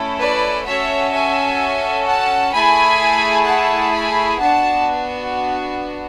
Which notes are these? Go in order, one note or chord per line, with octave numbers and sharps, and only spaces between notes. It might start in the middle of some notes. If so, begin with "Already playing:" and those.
Already playing: A3 C#4 E4 A4
B4 D5
C#4 F#4 A4 C#5 E5
E5 G#5
F#5 A5
A3 E4 G#4 G#5 B5
F#5 A5
G#5 B5
B3 D4 F#4 F#5 A5